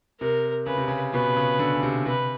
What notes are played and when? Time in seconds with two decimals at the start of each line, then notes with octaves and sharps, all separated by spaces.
0.20 C3 A#4
0.66 C#3 B4
0.78 C3
0.88 C#3
1.14 B2 B4
1.36 C#3
1.59 D3
1.74 C#3
1.83 C3
2.06 C3 B4